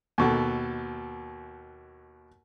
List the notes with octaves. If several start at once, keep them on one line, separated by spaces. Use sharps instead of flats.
D#2 B2 A4